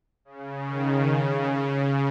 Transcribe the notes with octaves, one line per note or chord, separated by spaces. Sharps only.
C#3
D#3
C#3